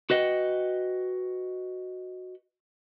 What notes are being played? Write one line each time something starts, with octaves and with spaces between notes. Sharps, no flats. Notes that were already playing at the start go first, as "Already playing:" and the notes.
F#4 B4 D#5 F#5 G5